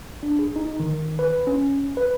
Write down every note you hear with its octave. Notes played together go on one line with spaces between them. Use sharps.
D4
G#4
D#4
D#3
B4
C#4
B4